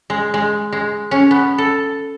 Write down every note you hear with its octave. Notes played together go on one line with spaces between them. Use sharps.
G#3
G#3
G#3
C#4
B3
A4